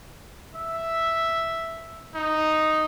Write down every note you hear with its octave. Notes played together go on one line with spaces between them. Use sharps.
E5
D#4